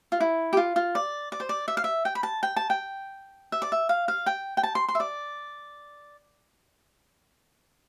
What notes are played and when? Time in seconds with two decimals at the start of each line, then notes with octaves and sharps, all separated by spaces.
0.12 F4
0.20 E4
0.53 G4
0.57 F4
0.76 F4
0.95 D5
1.32 D5
1.40 C5
1.49 D5
1.68 E5
1.77 F5
1.84 E5
2.05 G5
2.15 B5
2.23 A5
2.43 G5
2.56 A5
2.70 G5
3.52 E5
3.62 D5
3.72 E5
3.89 F5
4.08 F5
4.26 G5
4.57 G5
4.63 A5
4.75 C6
4.89 C6
4.95 E5
5.00 D5